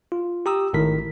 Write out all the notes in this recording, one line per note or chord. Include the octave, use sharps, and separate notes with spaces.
F4
G4 A#5 D#6 E6
G#1 A2 D#3 A#4 B6